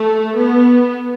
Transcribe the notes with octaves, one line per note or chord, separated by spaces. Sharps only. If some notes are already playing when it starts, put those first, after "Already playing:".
Already playing: A3
B3